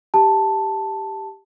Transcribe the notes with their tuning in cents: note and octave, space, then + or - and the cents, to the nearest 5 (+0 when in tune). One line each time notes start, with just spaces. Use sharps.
G4 +0 A5 +0